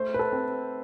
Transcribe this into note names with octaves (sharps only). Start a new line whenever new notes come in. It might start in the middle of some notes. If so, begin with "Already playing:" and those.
Already playing: A3 C5
B4
A4
C4